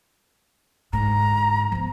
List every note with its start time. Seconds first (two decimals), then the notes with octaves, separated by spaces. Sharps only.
0.93 G#2 D3 A#5
1.72 F3 B3